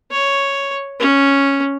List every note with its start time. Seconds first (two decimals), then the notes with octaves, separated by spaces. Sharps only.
0.11 C#5
1.00 C#4